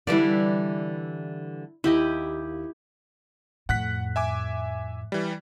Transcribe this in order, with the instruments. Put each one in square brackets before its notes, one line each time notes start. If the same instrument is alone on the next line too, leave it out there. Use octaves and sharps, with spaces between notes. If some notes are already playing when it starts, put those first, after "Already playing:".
[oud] D3 E3 G3 [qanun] E4 D5
[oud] D#2 [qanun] E4 G4 D#5
[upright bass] F2 A2 [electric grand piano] F#5 F#6 B6
[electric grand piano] E5 G#5 D6
E3 G3